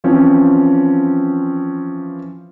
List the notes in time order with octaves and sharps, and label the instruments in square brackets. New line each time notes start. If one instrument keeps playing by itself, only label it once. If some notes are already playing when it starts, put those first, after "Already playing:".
[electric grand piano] E3 F3 C4 C#4